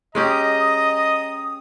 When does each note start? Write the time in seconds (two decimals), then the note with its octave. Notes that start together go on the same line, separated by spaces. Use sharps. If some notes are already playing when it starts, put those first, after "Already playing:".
0.15 G#3 C#4 G4 D#5 A#5 D#6